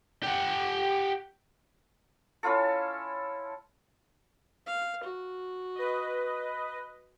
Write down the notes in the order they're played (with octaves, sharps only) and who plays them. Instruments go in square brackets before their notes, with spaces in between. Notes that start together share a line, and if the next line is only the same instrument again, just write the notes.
[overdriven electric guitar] G4 F#5
[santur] C#4 E4 F4 A4
[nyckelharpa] F5
F#4
[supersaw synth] B4 D#5